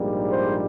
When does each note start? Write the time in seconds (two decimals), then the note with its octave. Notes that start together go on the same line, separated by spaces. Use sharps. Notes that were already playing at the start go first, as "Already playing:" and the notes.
Already playing: A#1 G#2 G3 A#3
0.30 C5